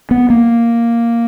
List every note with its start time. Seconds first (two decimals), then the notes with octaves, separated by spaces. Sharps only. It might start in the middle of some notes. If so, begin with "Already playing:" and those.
0.11 B3
0.30 A#3